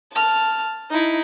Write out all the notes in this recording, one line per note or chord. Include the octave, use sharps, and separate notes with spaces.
A5 F6
D#4 E4